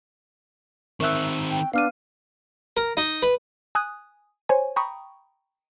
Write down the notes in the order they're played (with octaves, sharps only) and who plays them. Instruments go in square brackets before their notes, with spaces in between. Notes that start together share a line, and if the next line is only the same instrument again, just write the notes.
[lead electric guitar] D#3 C4 [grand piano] A#4 E5 F#6 [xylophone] C#6 E6
[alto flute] G5
[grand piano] B3 [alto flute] D4 [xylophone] F5 F6 D#7
[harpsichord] A#4
D#4
B4
[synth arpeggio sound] G#5 D#6 F#6
C5 C#5 G#5
G5 A#5 B5 C#6 D#6